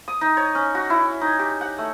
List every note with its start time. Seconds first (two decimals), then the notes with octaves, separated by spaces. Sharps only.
0.08 D#6
0.21 D#4
0.37 C#5
0.55 C#4
0.75 F#4
0.90 E4
1.21 D#4
1.39 G4
1.61 F#5
1.78 A3